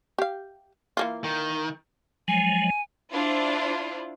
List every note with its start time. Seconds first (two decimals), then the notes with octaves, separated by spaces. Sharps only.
0.18 G4 F5
0.97 E3 A#3 F4
1.24 D#3
2.28 F3 F#3 G#3 G#5
3.11 D4 E4 F4 C5